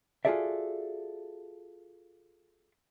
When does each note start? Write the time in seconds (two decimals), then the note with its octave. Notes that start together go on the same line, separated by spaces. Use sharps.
0.25 F4 F#4 G#4 A4 D5 E5